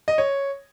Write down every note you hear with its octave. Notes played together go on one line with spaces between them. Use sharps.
D#5
C#5